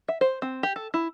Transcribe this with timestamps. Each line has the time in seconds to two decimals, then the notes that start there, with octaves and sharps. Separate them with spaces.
0.08 E5
0.21 C5
0.42 C4
0.63 G4
0.76 A4
0.94 E4